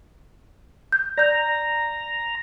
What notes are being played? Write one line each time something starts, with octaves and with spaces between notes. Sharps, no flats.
G6
D5 A#5 G6